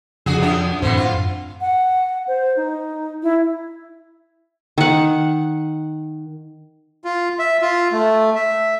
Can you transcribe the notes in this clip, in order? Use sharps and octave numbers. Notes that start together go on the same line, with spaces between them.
F2 C#3 D4 F#4 G#4
F#2 D4 D#6
F#2 A2 D3 E3 C4
F4
F#5
C5
D#4
E4
D#3 F#5
F4
E5
F4
A3
E5